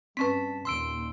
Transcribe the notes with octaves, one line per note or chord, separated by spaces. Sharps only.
G2 C4 C#4 B4 A5 B6
D#2 A#2 C6 E6 D7